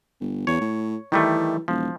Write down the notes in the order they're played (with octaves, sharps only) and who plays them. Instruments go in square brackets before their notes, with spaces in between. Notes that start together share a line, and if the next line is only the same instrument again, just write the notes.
[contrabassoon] G1
[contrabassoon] E2 [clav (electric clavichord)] C#5
[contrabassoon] A2
[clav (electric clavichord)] D#3 G3 A3 [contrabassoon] E3
[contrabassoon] E1 [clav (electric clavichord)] F3